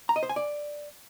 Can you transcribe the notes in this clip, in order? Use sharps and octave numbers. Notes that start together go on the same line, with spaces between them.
A#5
D#5
C5
G#5
D5